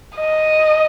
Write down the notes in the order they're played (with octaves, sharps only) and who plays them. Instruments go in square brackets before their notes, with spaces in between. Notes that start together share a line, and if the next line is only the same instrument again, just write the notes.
[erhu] D#5